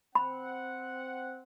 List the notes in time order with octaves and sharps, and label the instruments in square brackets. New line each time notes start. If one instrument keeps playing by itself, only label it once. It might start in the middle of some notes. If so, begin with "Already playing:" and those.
[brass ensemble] C4 F#5 [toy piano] B5